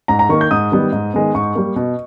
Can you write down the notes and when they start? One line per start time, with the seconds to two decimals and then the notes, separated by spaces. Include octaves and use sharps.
0.08 G#2 A#5
0.19 A#5
0.29 D#3 A#3 C#6
0.41 G6
0.51 G#2 D#6
0.72 D#3 G3 B3
0.92 G#2
1.14 D#3 G#3 B3
1.35 G#2 C#6
1.55 G3 A#3
1.76 B2